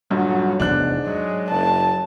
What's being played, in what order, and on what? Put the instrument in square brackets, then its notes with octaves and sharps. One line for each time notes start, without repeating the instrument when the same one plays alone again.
[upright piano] D#1 G2 [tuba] F#3
[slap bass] F1 E2 B3 [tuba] G#2 [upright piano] D4 F#6
[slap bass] F#3 [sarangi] G#3
[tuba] F#1 [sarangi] A5